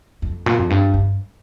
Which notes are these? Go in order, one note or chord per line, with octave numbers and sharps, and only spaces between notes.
F2
A#2
F2
G2
G2